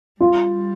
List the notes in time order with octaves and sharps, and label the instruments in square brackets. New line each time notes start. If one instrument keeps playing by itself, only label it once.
[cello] G3 [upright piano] F4